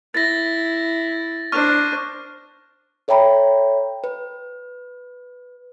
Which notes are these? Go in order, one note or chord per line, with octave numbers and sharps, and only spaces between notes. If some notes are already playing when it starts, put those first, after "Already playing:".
E4 A6 A#6
D4 C5 C#6 F6
A4 C#5 E5 G5 A#5 B5
B4